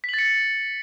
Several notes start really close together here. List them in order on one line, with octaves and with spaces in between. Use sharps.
B6 F#7 A6 C#7